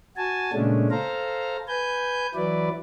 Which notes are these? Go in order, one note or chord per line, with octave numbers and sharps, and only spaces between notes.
F#4 G#5 A5
A#2 C#3 G#3 A3 C#4 D4
A4 C5 F5 A#5
B4 G#5 G6
E3 F#3 E4 B4 D5